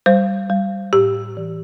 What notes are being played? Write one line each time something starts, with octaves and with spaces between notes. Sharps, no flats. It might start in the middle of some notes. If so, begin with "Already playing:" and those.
G3 C5
G3
A2 G4
E3